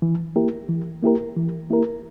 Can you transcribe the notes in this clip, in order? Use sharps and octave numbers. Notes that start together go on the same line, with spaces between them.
E3
A#3 E4 G4 A#4
E3
A#3 E4 G4 A#4
E3
A#3 E4 G4 A#4